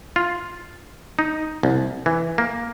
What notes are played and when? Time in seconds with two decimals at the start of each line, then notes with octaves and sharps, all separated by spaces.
0.16 F4
1.19 D#4
1.63 C2
2.06 E3
2.38 A#3